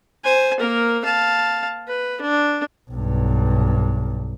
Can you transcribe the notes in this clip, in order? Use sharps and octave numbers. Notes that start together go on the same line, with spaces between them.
C5 G#5
A#3 A#4
F5 A5
B4
D4
B1 G2